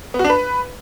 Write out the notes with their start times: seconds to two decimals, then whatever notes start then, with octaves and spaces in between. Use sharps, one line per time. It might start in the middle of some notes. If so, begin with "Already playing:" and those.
0.14 B3
0.19 F#4
0.24 D4
0.30 B4